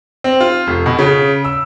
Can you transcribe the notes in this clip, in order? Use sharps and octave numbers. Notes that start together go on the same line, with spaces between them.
C4
F4
F1
B2
C#3
E6